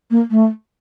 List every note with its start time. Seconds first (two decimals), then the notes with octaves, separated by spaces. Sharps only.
0.10 A#3
0.30 A3